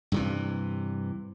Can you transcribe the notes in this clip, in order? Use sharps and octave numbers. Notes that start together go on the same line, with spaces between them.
G2 C3 E3